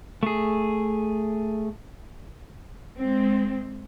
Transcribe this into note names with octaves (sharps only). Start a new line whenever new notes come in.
A3 G#4
G#3 C4